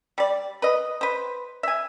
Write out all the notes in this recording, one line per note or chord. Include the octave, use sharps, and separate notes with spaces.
G3 D5
B4 D#5
B4 C5
E5 G#5